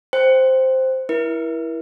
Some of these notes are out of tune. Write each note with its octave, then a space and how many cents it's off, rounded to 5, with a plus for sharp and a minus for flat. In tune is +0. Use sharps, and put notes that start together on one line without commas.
C5 +0 G5 +0
E4 +0 A#4 +40